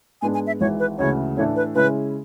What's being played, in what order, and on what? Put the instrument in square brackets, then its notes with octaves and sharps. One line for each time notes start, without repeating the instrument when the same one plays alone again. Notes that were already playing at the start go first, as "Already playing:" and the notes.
[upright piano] G#2 G#3 B3 D4 [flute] G#5
[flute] G#5
E5
[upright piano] G#1 G#2 E3 [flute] C#5
[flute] B4
[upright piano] D2 C#3 E3 G#3 [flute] C#5
[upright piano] A2 E3 A3 D4 [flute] C#5
[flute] B4
[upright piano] C#3 G#3 C#4 E4 [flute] B4